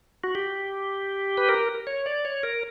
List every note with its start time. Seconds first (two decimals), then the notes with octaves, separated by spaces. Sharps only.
0.24 F#4
0.35 G4
1.38 B4
1.49 A#4
1.87 C#5
2.06 D5
2.25 C#5
2.43 A#4